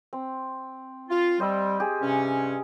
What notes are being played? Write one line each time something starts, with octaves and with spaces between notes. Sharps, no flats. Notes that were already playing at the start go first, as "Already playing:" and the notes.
C4
F4
G3 C5 D#5 E6
G4 G#4
G2 C3 C#4